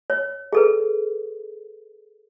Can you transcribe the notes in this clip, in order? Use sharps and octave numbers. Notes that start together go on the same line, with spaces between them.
C#5
G#4 A4 B4